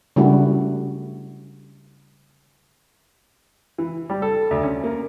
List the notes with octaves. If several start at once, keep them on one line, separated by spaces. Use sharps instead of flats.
C#3 G3 A3 D4 E4 F#4
E3
G3
A4
D2
C#4
A#3